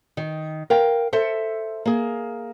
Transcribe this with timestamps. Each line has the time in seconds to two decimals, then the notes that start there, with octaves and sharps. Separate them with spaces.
0.17 D#3
0.70 A#4 F5 G5
1.13 A4 C5 E5
1.86 A#3 G#4